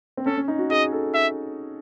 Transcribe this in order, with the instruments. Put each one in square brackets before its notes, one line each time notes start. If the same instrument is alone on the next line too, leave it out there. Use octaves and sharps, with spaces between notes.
[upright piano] C4
[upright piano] C#4 [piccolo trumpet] A4
[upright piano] C#4
D#4
F#4
[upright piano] G#4 [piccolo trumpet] D#5
[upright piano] A4
[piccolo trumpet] E5